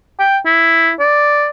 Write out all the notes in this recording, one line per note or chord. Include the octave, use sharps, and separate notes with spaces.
G5
E4
D5